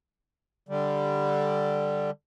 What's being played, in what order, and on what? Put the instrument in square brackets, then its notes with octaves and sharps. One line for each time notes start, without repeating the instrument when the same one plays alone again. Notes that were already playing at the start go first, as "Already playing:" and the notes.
[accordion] D3 G3